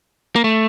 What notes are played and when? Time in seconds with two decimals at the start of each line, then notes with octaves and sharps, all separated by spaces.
0.36 A#3
0.44 A3